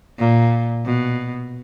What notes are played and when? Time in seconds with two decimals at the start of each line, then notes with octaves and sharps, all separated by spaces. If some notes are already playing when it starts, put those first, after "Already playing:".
0.18 A#2
0.85 B2